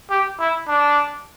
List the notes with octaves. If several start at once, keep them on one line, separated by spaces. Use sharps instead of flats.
G4
E4
D4